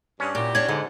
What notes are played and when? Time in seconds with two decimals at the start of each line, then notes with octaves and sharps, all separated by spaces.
0.20 G2 C#4
0.35 A#2 E4 F#4 G4
0.55 C#4 D4 G#6
0.68 G#2 D3